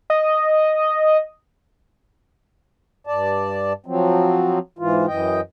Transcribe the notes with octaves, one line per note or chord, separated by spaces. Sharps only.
D#5
G2 D5 A5
F3 F#3 C4
G#2 E3 F4
F#2 E3 D#5 G5